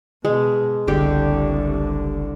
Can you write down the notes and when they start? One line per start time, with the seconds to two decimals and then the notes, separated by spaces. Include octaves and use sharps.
0.25 B2 G#3
0.88 F#1 C2 D3 G4